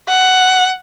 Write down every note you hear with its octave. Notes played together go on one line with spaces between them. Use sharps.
F#5